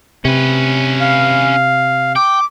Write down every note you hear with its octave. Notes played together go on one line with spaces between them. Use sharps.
C3 C#4 B4
F5
G5 D6